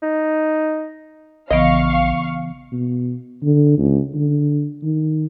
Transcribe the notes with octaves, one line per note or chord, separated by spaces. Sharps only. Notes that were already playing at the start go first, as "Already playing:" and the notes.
D#4
A#1 C#3 E3 B3 D#5 F5 C#6
B2
D3
C#2
D3
D#3